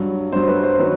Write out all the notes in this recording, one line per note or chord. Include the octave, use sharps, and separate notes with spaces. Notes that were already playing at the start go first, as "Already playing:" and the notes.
Already playing: G2 F#3
G2 F#3 C5
B4
C5
D#3 F#3 B4